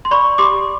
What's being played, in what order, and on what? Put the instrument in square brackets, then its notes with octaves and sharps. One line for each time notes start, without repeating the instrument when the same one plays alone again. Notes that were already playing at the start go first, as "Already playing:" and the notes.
[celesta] C6
D5 B5 C#6
G4 C6 D6